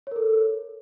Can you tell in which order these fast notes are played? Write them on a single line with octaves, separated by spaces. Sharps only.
C#5 A#4 A4